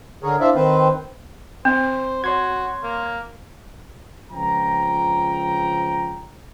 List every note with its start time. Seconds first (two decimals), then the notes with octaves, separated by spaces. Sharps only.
0.23 D3 G#4 A#4 C#5
0.40 D4 E4 C5 D5 E5 F5
0.55 D#3 C4 B4 C5
1.65 C4 C5
2.24 F#4 C#5 C6 G#6
2.83 A#3
4.31 C#2 F3 C4 G5 A#5